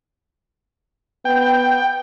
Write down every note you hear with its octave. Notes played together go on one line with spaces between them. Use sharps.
B3 G5